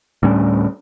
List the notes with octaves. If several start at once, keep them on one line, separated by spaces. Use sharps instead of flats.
D2 A2 G3 C#4